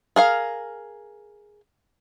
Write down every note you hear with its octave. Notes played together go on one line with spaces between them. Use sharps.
G#4 A#4 F5